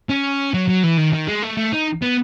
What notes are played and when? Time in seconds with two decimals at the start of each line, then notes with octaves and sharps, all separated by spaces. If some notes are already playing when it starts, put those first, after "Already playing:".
0.09 C#4
0.54 F#3
0.69 F#3
0.84 E3
0.98 D#3
1.13 D#3
1.28 G#3
1.43 A3
1.57 A3
1.72 D#4
2.02 B3